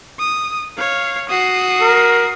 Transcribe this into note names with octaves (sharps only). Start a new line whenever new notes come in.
D#6
C#5 F5
F#4 D#6 C7
A#4